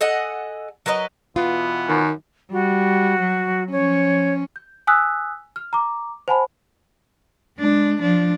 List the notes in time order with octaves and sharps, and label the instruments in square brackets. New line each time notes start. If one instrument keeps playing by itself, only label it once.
[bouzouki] A4 D#5 F#5 G#5
F#3 A#4 B4 D#5
[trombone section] B2 E3 B3 [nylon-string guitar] F4
[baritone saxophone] F#2 [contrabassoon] D#3
[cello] G3 [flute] F#4
[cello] F#3
[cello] F3 C#4 [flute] C#5
[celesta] G6
G#5 D#6 E6 F#6 B6
F6
A#5 D6
C5 F#5 G#5 A5 B5
[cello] G#3 D4
F3 D4